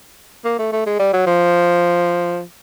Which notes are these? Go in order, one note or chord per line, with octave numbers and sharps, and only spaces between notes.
A#3
A3
A3
G#3
G3
F#3
F3